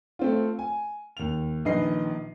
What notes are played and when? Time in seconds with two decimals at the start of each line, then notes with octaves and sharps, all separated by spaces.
0.19 A3 C4 F4
0.59 G#5
1.17 D#2 F7
1.65 A#1 D#3 D#4 B4 D#5 C7